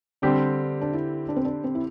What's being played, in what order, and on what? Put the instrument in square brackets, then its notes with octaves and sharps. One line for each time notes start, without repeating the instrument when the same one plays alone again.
[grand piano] D3 G3 C4 G4 [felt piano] D4
[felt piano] D4
E4
D4
C4
D4
C4
E4